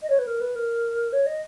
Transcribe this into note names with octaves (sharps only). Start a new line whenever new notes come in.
D#5
C#5
B4
A#4
B4
A#4
C#5
D#5